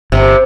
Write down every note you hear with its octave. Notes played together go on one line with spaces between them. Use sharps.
G1 C3